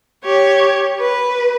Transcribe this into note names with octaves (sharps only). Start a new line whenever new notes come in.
G4 C#5
B4